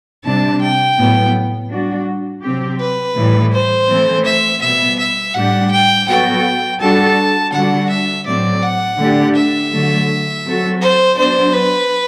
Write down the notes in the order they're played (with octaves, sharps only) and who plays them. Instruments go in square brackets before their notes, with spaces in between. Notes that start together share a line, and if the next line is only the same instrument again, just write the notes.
[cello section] C3 G3 D4 [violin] A5
[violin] G5
[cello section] A2 F#3 B3
G3 D4 F#4
C3 F#3 C4 G4
[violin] B4
[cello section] A2 E3 G3
[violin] C5
[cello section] E3 A3 C4
[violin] E5
[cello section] B2 G3 B3 [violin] E5
[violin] E5
[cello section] A2 G3 D4 G4 [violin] F#5
[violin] G5
[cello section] F#3 B3 F#4 A4 [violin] G5
[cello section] G3 D4 F#4 A4 [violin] A5
[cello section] D3 G3 D4 F#4 [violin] F#5
[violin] E5
[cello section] A2 F#3 C4 [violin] D5
[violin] F#5
[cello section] D3 A3 D4 G4
[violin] E5
[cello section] D3 F#3 A3
F#3 C4 F#4 A4
[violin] C5
[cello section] F#3 B3 D4 [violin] C5
[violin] B4